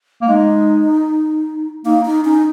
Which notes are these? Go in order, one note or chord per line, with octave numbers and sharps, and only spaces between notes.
A#3
G#3 D#4
A#3 D#4
D#4
C#4 D#4